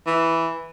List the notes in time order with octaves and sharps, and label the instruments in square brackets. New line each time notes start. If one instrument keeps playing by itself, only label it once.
[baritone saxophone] E3